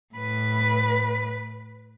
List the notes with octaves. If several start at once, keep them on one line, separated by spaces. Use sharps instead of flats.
A2 B4